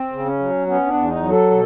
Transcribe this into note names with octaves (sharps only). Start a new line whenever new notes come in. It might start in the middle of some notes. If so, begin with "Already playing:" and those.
Already playing: C4
C#3
C#4
F#3
B3 C#4
D4
E2
D#4
F#3
A4
B2